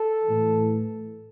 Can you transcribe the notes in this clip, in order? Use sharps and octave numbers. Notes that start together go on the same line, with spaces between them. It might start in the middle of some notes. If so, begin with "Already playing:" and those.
Already playing: A4
A2 E3